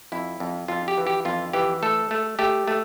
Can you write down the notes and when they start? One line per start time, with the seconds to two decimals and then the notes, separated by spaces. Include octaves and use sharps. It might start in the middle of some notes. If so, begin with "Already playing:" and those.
0.12 F2 E4
0.40 F2
0.68 F2 F4
0.88 G4
0.98 E3
1.07 G4
1.25 F2 F4
1.53 E3 G4
1.83 A3 A4
2.11 A3
2.39 A3 G4
2.68 A3